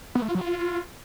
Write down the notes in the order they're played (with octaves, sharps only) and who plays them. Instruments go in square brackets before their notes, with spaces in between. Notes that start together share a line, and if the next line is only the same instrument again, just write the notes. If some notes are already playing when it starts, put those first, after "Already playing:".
[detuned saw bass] B3
A3
F4
F#3
F4